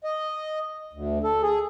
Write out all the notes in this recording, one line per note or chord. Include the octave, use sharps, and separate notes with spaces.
D#5
D2
A4
G#4